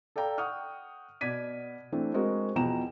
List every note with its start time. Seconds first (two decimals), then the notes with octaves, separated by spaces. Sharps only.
0.16 A4 D5 F5 G5 A#5
0.38 F#5 G5 C#6 D#6 F6
1.21 B2 D5 G#6 B6 D#7
1.92 E3 A3 C4 D4
2.14 G#3 C4 F#4 A#4 C5 D#5
2.55 E2 B2 F3 G5 A#5 E7